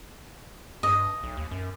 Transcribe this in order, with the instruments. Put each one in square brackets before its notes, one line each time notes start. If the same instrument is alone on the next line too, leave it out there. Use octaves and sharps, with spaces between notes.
[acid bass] G2 [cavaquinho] D#5
[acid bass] B1
D#2
F#2